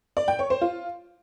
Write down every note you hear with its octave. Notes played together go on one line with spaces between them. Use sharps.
D5
G5
C#5
C5
F4